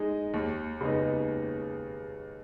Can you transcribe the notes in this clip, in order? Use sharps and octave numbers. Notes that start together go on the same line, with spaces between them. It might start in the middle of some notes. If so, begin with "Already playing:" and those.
Already playing: G#3 D#4
D#2
C#3 G#3 B3 D#4